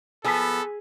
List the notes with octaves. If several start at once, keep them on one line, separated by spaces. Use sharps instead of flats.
F3 B3 G#4 A4 G#5 A5 E6 B6